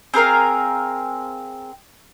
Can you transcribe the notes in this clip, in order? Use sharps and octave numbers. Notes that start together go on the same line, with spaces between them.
C4 G#4 A#4 F5